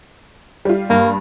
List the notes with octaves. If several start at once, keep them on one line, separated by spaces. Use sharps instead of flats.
G3 F4
G2 A#3